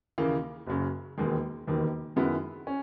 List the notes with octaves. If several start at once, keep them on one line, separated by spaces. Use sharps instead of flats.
D#2 C#3 E3 A#3
F#1 F#2 C#3
E1 D#2 D#3 G#3
E1 D#2 D#3
F#2 D#3 G#3 B3 E4
C#4